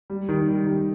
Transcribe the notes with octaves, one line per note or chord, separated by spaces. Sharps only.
G3
D#3
G3
D#3